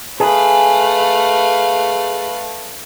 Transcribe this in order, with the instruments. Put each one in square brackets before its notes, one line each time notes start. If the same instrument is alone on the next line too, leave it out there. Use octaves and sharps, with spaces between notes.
[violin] A3 [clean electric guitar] G#4 [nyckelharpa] B4 F5